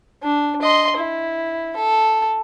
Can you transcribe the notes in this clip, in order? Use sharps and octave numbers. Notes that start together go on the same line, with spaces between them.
D4
D#5 C6
E4
A4